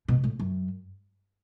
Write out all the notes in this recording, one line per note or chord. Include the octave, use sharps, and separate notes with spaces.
B2
A2
F#2